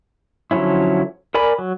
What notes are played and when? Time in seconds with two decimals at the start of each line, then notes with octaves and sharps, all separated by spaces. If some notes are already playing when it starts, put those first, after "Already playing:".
0.51 D3 F3 F#3 C#4 E4
1.34 A#4 D5 G#5 B5
1.59 F#3